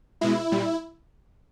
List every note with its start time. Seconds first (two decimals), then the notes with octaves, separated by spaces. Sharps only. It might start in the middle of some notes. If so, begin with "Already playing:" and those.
0.21 B2 G#3 E4
0.52 A#2 G3